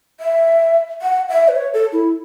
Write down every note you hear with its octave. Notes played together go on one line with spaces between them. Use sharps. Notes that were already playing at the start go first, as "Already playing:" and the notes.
E5
F#5
E5
B4
C#5
A4
E4